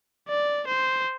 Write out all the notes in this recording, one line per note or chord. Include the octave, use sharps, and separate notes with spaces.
D5
C5